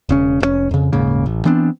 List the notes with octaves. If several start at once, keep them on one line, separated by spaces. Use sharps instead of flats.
E1 C#3 C#4
F1 A#2 C#4
F2 C#3
D#1 G#2 C#3 A#3
A1
E3 B3 C4 D4